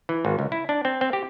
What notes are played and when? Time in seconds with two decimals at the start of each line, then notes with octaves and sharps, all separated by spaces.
0.09 E3
0.25 G#1
0.39 C#2
0.52 E4
0.69 D4
0.85 C4
1.01 C4
1.13 G4